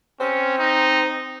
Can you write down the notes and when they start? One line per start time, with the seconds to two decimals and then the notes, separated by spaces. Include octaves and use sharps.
0.20 C4 C#4
0.59 D#4